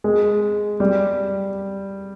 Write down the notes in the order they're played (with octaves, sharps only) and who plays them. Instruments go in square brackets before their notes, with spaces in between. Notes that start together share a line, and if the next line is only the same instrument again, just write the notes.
[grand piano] G#3
G3